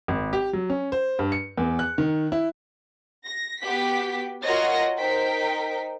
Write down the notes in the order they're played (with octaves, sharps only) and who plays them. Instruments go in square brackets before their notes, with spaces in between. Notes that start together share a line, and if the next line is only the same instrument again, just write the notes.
[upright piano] G#1
G4
F#3
C#4
C5
G2
C#7
E2
F#6
D#3
E4
[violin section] A#6
B3 F#4 G4 G5 B6
F4 F#4 A#4 C#5 D#5 A#6
D#4 A#4 C5 G5 B6